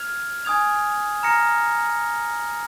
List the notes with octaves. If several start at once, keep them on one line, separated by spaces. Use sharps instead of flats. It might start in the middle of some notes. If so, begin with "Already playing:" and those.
Already playing: F6 G#6 F7
G#5 D#6 G#6 F7
A#5 F6 A#6 C#7